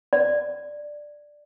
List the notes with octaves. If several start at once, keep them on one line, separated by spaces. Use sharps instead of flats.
D5